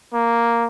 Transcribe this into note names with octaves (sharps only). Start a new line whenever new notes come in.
A#3